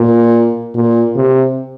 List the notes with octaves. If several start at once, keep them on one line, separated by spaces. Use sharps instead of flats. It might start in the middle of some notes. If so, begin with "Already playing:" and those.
Already playing: A#2
A#2
C3